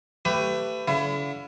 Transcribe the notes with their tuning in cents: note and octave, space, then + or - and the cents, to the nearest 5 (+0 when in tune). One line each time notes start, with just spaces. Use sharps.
A3 +20 G4 +0 B4 +30
D3 -45 E4 +35